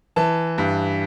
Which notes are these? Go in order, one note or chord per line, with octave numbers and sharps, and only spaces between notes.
E3 A5
G2